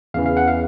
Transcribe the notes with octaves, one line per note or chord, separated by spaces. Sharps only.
E2 C#3 E3 F5
F5
F#5
F5